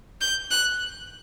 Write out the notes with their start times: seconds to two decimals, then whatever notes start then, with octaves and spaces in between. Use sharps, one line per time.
0.21 G6
0.51 F#6